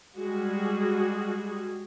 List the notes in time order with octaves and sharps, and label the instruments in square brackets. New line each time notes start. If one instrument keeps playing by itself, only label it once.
[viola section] G3 G#3 F#4 G#4